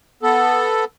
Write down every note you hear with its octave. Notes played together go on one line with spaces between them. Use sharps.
B3 A4